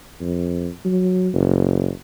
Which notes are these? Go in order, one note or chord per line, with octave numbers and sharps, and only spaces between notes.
F2
F#3
F#1